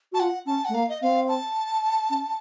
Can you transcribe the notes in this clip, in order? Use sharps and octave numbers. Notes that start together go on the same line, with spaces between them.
F#4 A5
F4 F#5
C#4 A5
A3 F#5
A#3 F5
D#5
C4 F5
A5
C#4